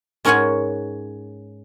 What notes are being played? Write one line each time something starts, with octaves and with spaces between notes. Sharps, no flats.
G#2 C#4 A#4 C#5 F#5 G#5